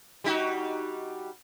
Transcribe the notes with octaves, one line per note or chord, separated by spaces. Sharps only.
G3 D#4 F#4